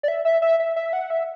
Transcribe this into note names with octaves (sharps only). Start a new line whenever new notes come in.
D5
E5
E5
E5
E5
E5
F#5
E5